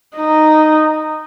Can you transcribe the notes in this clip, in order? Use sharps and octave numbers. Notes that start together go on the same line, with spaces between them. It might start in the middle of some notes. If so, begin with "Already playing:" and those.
D#4